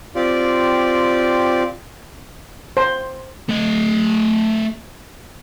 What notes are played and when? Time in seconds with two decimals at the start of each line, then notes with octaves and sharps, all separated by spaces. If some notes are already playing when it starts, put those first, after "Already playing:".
0.15 C4 F4 G4 D5
2.77 C5
3.49 A3 D#5